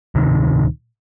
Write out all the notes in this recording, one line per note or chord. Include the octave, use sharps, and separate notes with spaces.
D1 C3 D#3